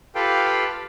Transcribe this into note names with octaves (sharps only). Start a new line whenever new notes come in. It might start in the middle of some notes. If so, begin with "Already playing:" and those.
F4 G4 A4 B4 F5 G5